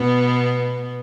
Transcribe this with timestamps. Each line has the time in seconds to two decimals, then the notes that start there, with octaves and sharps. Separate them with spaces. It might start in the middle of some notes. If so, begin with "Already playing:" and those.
Already playing: B2 B3